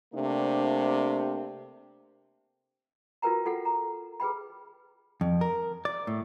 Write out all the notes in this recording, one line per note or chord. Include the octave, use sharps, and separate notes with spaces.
C3 A3 A#3 D4
F4 F#4 A#4 B4 G5 A#5
F4 A4 F#5 G5
A#5
G#4 B4 G5 B5
F2
A#4
D5
A2